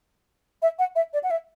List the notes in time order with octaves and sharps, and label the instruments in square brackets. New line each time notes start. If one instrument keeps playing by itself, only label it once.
[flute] E5
F#5
E5
D5
F#5
E5